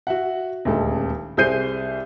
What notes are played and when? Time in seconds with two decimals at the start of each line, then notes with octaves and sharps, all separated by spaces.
0.07 F#4 E5 F#5
0.65 D#1 D2 G#3 A4
1.37 C2 G#4 C5 G6 C7 D#7